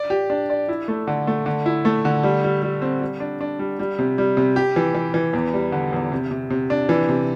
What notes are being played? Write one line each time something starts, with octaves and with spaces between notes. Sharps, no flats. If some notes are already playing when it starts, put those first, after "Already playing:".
Already playing: D5
G4
D4
D5
E4
A3
D3
A3
D3
E4
A3
D3
G3
G3
G3
C4
G3
D4
D4
G3
G3
C3
G3
C3
G4
E3
E3
E3
E2
G3
D3
E2
C3
C3
C3
D4
E3
C3